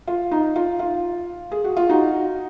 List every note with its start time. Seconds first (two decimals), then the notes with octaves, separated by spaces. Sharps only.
0.07 F4
0.31 D#4
0.56 F4
0.79 F4
1.52 G#4
1.64 F#4
1.77 F4
1.89 D#4 F#4